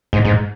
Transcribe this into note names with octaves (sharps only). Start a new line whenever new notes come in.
G#2
G#2